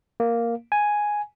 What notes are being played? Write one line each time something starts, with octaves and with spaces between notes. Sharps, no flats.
A#3
G#5